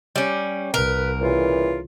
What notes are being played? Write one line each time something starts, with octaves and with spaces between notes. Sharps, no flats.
G3 C#4
C2 A#4 B4
A#2 C#3 E3 F4